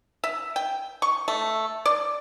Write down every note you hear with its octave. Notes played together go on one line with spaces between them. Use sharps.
E5
G5
C#6
A3
D5